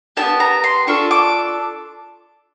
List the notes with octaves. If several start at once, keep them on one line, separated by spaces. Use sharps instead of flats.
B3 E4 G4 A5
A#5
C6
D4 F4 A4 C#6
D6